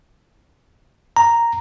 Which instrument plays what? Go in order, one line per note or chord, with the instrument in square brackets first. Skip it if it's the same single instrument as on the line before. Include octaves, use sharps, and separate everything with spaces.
[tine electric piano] A#5